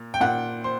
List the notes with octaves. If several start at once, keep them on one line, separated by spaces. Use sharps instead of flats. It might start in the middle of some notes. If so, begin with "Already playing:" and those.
Already playing: A#2
G5
A#2 F#5
C5